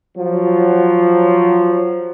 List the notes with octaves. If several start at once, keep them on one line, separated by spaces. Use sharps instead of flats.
F3 F#3